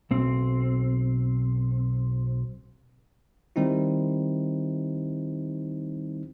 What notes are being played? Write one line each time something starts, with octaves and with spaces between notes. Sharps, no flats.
B1 C4
D#3 G3 C4 D#4 E4